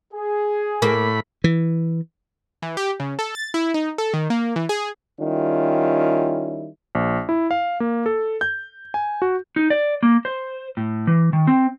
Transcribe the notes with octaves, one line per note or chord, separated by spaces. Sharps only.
G#4
A2 A#3 B5
E3
E3
G4
C#3
A4
A6
E4
D#4
A4
D#3
A#3
E3
G#4
D#3 G3 C#4 E4 F4
A#1
E4
F5
A#3
A4
G6
G#5
F#4
D#4
D5
A#3
C5
A2
E3
D#3
C4